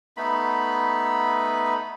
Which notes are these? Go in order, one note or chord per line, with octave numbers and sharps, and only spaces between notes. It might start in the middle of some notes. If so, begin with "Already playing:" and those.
A3 B3 D#4 B5